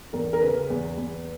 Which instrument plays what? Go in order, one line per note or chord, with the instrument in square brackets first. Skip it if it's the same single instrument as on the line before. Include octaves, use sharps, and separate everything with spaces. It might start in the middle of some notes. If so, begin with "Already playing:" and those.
[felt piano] E2 A#4
A#4
C#3 B4
E2
E2